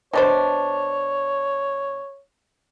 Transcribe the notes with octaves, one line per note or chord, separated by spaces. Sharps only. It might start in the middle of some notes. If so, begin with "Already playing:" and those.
B2 D4 C5 C#5